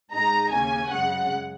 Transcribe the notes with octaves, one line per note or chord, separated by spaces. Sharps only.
G#2 G#3 D#4 A#5
D#2 C#3 A#3 C#4 G#5
F#2 C#3 G#3 F#5